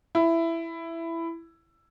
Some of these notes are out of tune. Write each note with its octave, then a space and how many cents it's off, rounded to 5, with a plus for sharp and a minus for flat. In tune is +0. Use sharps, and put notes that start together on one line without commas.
E4 +10